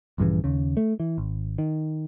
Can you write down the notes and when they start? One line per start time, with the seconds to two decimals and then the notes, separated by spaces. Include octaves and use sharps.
0.18 A#1 G2 C#3 E3
0.44 D#2 C#3
0.77 A3
1.00 E3
1.18 G#1
1.58 D#3